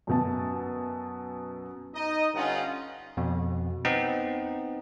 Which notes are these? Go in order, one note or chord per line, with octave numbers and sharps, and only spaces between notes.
F#2 B2 A5
D#4 D#5
G2 D3 C#4 D#4 F4 F#5
F2 B2
B3 C4 D#4